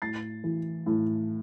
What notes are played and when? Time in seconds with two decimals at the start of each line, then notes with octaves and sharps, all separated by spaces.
0.02 A2 A6 C7
0.44 E3
0.86 A2